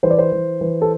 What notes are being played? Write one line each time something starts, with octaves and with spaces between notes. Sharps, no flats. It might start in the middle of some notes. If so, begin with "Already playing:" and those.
E3 C5
D5
C5
E3
E3
A4